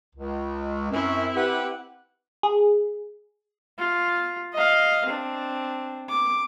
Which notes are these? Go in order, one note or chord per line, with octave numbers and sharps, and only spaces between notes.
C#2
F#2 C4 E4
G4 B4 F#5
G#4
F4
D#5 F5
C4 D4
D6